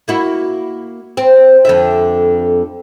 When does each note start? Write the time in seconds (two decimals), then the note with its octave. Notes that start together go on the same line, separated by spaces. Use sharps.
0.08 A#3 E4 F#4
1.17 C4
1.65 F2 D3 E5